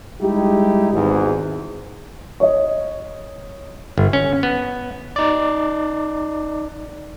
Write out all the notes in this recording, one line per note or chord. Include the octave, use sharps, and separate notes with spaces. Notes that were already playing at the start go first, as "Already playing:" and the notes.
G3 G#3 D#4 E4 G4
G#1 E2 G#2
C#5 D#5
G1
C#4
B3
D#4 D5